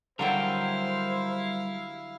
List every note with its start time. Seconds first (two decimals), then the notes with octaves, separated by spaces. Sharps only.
0.19 D3 F#3 G3 E4 A#4 C5 F5 G5